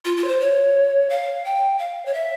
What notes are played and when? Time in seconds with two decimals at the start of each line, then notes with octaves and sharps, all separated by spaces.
0.05 F4
0.17 F4
0.24 C#5
0.28 C5
0.40 C#5
1.10 F5
1.45 G5
1.79 F5
2.06 C#5
2.14 E5